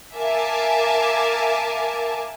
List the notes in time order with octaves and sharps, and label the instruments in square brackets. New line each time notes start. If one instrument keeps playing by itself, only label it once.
[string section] A#4 E5 F5 G#5 A5 D6